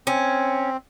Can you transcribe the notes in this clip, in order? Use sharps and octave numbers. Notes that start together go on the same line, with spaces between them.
C4 C#4